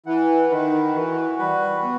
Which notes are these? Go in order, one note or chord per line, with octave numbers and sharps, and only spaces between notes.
E3 F#5
D#3 B4
E3 F#4
G3 B4
B3